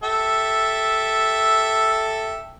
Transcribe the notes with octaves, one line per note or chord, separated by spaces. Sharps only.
G4 A4 E5